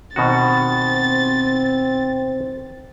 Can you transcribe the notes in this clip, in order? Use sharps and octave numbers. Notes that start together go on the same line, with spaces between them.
B2 D#3 C4 F#4 A6